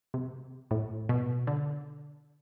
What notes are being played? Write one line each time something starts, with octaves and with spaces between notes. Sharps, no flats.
C3
A2
B2
D3